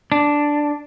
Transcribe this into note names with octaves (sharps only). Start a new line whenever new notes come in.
D4